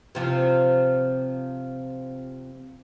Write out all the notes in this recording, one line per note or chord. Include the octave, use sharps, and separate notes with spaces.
C3 F3